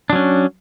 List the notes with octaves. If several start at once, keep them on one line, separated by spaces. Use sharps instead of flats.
F#3 C#4 D4